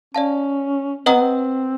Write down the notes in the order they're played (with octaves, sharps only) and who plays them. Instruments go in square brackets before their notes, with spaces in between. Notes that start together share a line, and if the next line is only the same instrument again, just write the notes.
[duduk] C#4 [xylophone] D5 F5 A5
[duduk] C4 [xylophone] B4 D#5 F#5 A#5 D#6
[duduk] B3
C4